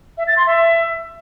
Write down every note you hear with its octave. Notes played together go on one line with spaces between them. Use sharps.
E5
A6
C6
E5